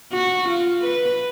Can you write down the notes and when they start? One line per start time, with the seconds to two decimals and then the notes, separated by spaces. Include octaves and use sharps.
0.13 F#4
0.49 F4
0.84 B4